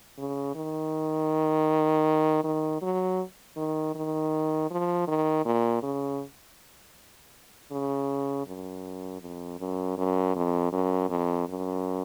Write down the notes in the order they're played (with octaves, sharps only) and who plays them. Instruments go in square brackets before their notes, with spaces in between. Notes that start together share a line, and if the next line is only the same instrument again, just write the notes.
[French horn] C#3
D#3
D#3
F#3
D#3
D#3
F3
D#3
A#2
C#3
C#3
F#2
F2
F#2
F#2
F2
F#2
F2
F#2